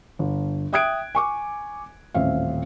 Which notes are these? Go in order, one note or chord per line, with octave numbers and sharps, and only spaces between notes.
G1
E5 G5 D#6 F#6 G#6 D7
G#5 C#6 D6
D#1 A1 C4 E5 F5